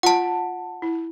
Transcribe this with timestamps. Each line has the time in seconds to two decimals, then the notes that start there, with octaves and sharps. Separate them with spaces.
0.03 F4 F#5 A5
0.82 E4